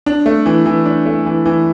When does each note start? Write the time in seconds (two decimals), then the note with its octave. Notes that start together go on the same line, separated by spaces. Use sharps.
0.06 D4
0.26 A3
0.46 E3
0.66 E3
0.85 D4
1.06 A3
1.26 E3
1.46 E3